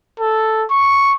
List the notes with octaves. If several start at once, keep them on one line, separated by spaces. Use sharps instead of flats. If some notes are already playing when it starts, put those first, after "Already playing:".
A4
C#6